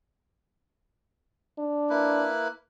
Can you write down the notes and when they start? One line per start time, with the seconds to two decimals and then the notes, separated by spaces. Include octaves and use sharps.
1.58 D4
1.90 A#3 E4 B4